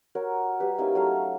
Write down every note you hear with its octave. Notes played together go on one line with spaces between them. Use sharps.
F#4 A#4 C#5
G3 G4 B4
A#3 C#4 D#4 E4
F#3 A3 F5